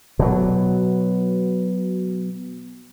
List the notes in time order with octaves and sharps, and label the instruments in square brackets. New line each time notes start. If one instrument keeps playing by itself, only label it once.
[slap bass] B2 F#3